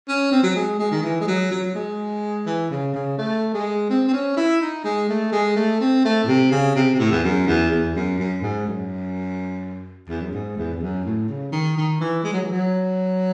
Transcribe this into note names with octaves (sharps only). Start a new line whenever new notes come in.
C#4
C4
F#3
G#3
G#3
D#3
E3
G#3
F#3
F#3
F#3
G#3
E3
C#3
C#3
A3
G#3
C4
C4
C#4
E4
D#4
G#3
A3
G#3
A3
C4
A3
A2
C3
C#3
C3
C3
A2
E2
F#2
E2
E2
F#2
F#2
G#2
F#2
E2
F#2
G#2
E2
E2
F#2
A2
C#3
D#3
D#3
E3
G#3
F#3
E3
F#3